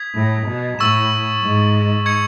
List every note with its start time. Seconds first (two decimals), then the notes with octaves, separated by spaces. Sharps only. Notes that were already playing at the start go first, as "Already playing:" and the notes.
Already playing: D#6 G#6 B6
0.15 A2
0.47 B2
0.79 A2 C#6 E6 A6 E7
1.42 G#2
2.06 C#6 G#6 C#7